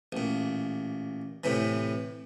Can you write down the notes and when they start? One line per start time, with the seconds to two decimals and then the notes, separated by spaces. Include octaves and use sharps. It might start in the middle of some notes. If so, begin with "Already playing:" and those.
0.12 A1 A#2
1.44 A2 C3 E3